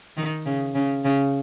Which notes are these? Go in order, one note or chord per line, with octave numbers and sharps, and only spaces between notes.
D#3
C#3
C#3
C#3